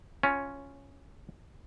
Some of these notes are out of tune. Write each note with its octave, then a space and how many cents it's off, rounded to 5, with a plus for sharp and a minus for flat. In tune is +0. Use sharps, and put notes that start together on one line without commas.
C#4 +0 F4 -5 C#5 -15